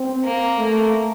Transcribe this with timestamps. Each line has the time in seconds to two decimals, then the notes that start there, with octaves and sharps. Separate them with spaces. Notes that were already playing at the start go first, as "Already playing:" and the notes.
Already playing: C4
0.25 A#3
0.58 A3